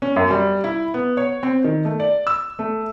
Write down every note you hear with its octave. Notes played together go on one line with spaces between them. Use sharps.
C#4
F#2
G3
E4
B3
C#5
C4
D#3
A3
D5
E6
A3